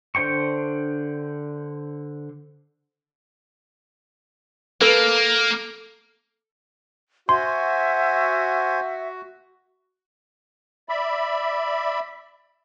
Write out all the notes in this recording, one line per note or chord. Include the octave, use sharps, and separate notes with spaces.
D3 D4 C5 G5 C#6
A#3 A4 B4
F#4 C5 E5 G#5 C6
D5 E5 B5